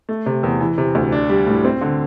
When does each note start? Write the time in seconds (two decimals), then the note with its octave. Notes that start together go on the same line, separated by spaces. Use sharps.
0.09 A3
0.26 C3
0.43 E2
0.60 E3
0.78 C3
0.95 D2
1.12 D4
1.29 G3
1.47 A2
1.65 C4
1.81 D3